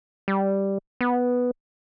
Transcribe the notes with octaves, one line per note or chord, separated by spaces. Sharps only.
G3
B3